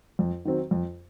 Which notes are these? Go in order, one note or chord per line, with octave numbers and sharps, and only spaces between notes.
F2
D#3 F#3 C4
F2